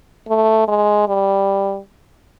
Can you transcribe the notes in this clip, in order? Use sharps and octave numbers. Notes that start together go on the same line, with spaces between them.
A3
G#3
G3